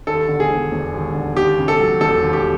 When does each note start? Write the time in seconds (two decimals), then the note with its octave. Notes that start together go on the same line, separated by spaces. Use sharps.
0.07 D#2 A4
0.28 D3
0.40 G#4
0.50 E1
0.72 E1
0.93 D#2
1.15 D3
1.36 D#2 G4
1.58 C#3
1.68 A4
1.80 F#3
2.01 E1 A4
2.22 D#2
2.33 G4